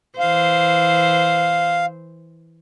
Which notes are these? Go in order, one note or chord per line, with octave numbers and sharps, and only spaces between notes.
E3 C5 F5